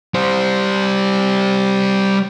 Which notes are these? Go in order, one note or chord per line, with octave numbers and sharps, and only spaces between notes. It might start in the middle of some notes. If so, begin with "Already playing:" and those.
G3 C5